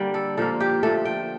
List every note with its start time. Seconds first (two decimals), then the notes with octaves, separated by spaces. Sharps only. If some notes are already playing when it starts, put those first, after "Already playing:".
Already playing: D3 G3 A#3 D5
0.14 A4
0.37 A#2 F3 A#3 A4
0.60 G4
0.83 A#2 F3 A3 A4
1.05 G5